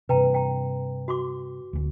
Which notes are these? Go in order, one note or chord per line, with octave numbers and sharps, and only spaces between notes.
G2 C3 B4 G5 A#5
G5 A#5
F#4 C6 D6
D1 D2